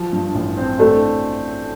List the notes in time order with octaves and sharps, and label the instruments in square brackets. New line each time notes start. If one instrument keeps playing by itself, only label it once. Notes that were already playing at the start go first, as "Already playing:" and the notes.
Already playing: [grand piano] F3
G2
A1
C4
[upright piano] A3 [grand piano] D4